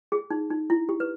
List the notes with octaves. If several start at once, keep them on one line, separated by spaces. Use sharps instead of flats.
G#4
D#4
D#4
E4
G4
B4